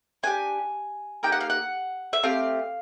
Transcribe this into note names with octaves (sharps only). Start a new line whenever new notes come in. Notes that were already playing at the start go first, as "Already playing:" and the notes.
D4 G4 G#5
A#3 D#4 G4 G5
F#5
F5
F#5
E5
A3 C4 G4 F5